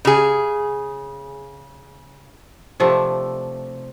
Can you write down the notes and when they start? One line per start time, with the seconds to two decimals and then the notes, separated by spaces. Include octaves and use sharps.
0.05 C#3 G#4
2.80 C3 F3 A3 D4